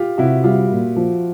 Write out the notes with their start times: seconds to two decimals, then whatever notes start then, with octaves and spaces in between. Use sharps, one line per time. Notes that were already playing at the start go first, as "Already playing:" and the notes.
Already playing: F4 G4
0.18 C3 E4 F#4
0.44 G3 F4 G4
0.71 A#2
0.96 F3